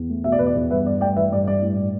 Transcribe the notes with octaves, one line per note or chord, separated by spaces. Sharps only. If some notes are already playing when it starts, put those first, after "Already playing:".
Already playing: E2
A3
B2 E5
D5
E2 B4
D5
E2
G2 B4 E5
G2 D5
A3 D5 G5
E3 B4 E5
G2 D5
G2 D5
A2
A2